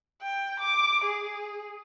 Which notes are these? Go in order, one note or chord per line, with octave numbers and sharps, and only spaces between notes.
G5
D6
G#4